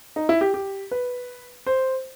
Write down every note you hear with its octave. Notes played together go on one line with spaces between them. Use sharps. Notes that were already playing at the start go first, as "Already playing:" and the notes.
D#4
E4
G4
G4
B4
C5